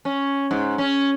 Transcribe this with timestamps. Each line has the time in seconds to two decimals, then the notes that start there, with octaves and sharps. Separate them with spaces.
0.05 C#4
0.51 G#2
0.78 C#4